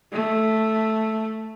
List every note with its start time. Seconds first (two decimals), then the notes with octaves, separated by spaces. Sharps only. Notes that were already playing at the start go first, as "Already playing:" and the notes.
0.13 A3